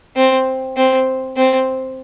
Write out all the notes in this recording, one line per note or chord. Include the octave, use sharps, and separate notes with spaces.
C4
C4
C4